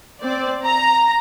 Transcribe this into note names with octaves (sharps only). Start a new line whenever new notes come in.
C4 D5
A#5